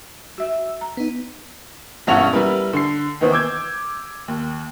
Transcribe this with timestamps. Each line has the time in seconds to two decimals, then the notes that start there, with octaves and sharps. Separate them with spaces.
0.38 F#4 E5 E6
0.81 A#5
0.97 B3 D#4
2.07 E1 G2 C#4 E4 F#5 F7
2.33 G3 E4 A#4 B4
2.73 D3 C7
3.21 D#2 D#3 E3 B3 C4
3.32 D6 E6 G6 G#6
4.28 D#2